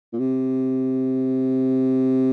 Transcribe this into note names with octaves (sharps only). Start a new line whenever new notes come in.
A#2
C3